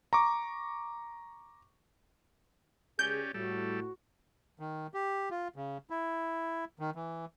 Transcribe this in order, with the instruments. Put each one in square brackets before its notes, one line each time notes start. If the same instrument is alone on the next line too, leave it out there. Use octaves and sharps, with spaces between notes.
[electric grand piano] A#5 C#6 D6
[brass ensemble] C#2 G#4 [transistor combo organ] C#4 G4 D5 [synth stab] G6
[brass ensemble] A2 [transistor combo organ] G3 A4 [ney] F#4
[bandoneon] D#3
G4
F4
C#3
E4
D#3
E3